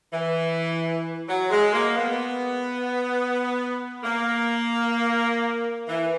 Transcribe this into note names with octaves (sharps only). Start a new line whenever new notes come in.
E3
F#3
G#3
A#3
B3
A#3
E3